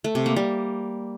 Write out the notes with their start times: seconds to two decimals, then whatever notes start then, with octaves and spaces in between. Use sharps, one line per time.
0.04 A3
0.15 C3
0.26 A#3
0.36 G3